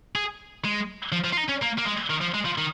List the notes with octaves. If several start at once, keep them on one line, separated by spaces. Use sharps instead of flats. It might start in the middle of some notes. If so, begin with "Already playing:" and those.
G#4
G#3
F3
F3
F4
D#4
C#4
A#3
A#3
G#3
D#3
F3
G#3
F3
D#3